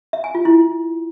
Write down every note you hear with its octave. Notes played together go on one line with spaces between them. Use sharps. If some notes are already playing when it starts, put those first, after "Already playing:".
E5
G#5
F4
E4